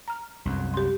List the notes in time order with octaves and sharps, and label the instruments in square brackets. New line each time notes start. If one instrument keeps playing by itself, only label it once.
[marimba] A#5 F6
[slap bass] C2 F#2
[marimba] G4 C6